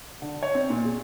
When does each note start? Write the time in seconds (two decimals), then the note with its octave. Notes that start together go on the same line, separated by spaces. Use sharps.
0.22 D3
0.43 C#5
0.55 C4
0.70 A#2
0.85 G#4